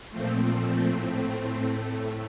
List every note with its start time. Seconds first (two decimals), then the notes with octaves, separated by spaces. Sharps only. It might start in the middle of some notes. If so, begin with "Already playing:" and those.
0.11 A#2 F3 A3 C4
0.49 C4
0.86 A2 A3 C4
1.62 A2 A3